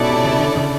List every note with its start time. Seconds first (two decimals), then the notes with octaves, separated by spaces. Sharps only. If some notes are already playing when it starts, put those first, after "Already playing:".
Already playing: G#2 B2 C#4 E4 A4 D5
0.09 C3
0.24 C#3
0.39 D3
0.56 C#3